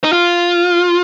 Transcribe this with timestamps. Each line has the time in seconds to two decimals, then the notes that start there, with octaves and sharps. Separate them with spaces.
0.04 D#4
0.13 F4